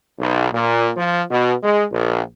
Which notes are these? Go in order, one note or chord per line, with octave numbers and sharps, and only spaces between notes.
B1
A#2
F3
B2
G#3
A#1